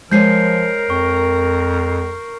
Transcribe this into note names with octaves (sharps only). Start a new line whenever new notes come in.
F3 G#3 A#4 C5 C#5 G6 C7
F2 C#6